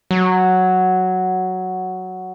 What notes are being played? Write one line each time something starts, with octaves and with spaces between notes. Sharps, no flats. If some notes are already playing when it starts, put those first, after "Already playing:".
F#3